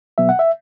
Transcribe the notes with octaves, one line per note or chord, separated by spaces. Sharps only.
B2 F#3 B3 E5
F#5
E5